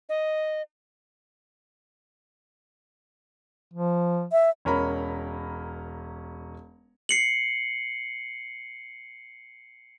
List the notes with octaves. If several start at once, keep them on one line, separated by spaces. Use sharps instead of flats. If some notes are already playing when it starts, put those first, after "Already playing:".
D#5
F3
E5
E1 C#4 A#4 A#5 B5
C7 C#7 F#7